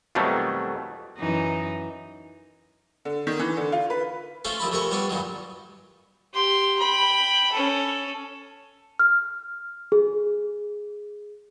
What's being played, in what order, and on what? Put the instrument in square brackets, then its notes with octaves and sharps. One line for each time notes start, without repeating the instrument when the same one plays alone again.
[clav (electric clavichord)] F2 B2 D#3 F#3 G3 A3
[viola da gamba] F#2 E3 D#4
[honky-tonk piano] D3
D#3
E3
D3
F4
B4
[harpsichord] A3 C#4 F4 C5 E5
D#2 F3 E4 A5 B5
F2 C3 A3 A#4 G#5 C#6
G3 B3 D4 C#5 D5
G2 A#2 D#3 F#3
[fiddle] G4 C6
G5 B5
C#4 A4
[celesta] F6
G#4